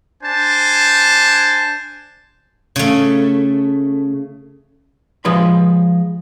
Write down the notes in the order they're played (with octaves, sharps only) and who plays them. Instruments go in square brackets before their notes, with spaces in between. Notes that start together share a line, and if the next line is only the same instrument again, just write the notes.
[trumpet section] D4 C5 G#5 A5
[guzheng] C#3 A3
[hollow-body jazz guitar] F3 G#3 B4 B5